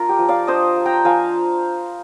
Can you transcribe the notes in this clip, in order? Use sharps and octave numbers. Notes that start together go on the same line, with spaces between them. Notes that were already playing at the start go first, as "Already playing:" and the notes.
Already playing: A#3 D4 F4 A#4
G4
F3
D5 F5
D4 C5 D#5
A#3
G5 A#5
F3 F5 G#5